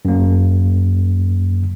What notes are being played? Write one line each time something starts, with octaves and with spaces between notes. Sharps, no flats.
F#2 A#3